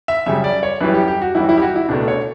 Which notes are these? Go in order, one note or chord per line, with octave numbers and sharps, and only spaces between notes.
E5
F#2 C#3 G3 E5
D5
C#5
F#2 E3 G3 B4
G4
G4
F#4
F#2 E3 G3 E4
E4
G4
F#4
E4
C#2 B2 A3 D4
C#5